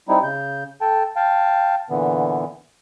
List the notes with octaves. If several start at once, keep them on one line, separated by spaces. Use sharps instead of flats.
G3 C4 D#4 E4
C#3 G6
A4 G5 A5
F5 G5 A5
A#2 D3 E3 B3